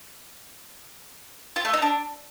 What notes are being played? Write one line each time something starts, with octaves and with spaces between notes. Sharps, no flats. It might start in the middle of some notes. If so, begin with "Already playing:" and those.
F4
A3
D#4
D4